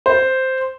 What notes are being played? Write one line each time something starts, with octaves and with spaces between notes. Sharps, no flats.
C5